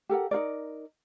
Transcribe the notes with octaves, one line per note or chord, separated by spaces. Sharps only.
G4 A4 A#4 F#5
D#4 F4 A#4 D5